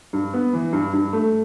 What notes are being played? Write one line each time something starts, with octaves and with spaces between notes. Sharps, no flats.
G2
B3
E3
G2
G2
A3